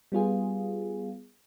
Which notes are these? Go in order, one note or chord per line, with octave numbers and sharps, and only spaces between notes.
G3 B3 F4 G#4